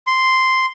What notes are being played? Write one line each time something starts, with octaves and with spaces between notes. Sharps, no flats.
C6